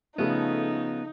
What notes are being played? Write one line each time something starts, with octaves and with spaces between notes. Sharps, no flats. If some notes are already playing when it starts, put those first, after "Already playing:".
C#3 F3 A3 B3 D#4 A4